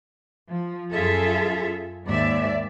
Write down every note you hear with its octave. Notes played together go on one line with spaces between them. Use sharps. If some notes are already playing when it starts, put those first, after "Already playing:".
F3
F#2 F4 G#4 A4 E5
D#2 G#2 D5 E5